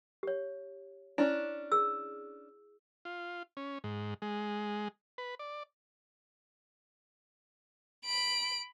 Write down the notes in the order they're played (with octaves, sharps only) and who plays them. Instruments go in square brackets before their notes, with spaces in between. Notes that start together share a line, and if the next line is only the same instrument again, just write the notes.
[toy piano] G4 C#5
[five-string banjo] C#4 D4 [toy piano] E4
[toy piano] G#4 E6
[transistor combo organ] F4
C#4
G#2
G#3
B4
D5
[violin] B5 D7